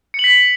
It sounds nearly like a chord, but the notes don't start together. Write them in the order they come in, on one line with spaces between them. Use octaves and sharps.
C#7 F#7 B6